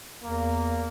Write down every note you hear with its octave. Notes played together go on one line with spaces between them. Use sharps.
E2 A#3